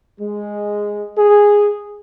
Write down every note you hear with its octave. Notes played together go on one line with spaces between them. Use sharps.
G#3
G#4